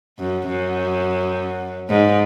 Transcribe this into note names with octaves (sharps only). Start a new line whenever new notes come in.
F#2
F#2
G#2